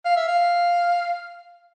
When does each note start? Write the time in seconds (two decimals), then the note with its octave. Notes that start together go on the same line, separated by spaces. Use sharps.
0.05 F5
0.16 E5
0.28 F5